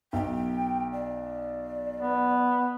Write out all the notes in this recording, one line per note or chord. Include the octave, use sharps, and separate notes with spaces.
B1 G5
D5
B3